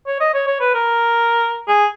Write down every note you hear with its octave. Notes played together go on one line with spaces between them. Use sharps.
C#5
D#5
C#5
C#5
B4
A#4
G#4